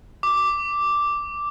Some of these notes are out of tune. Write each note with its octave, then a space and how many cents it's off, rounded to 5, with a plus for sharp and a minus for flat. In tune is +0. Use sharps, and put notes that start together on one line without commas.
D6 -5